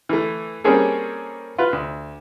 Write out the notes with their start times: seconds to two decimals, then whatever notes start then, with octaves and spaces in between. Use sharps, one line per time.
0.09 E3 A3
0.64 G3 A#3 C4 C#4 G#4 A4
1.58 F4 B4
1.73 D2